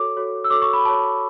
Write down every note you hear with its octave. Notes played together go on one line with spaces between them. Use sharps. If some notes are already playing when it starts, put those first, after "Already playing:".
Already playing: F#4 A4 C#5 D6
F#4 A4 C#5
E6
F#4 A4 C#5 D6
C#6
B5
F#4 A4 C#5 A5